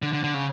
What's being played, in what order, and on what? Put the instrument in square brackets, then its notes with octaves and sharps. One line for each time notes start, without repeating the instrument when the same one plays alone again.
[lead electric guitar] D3
D3
D3
C#3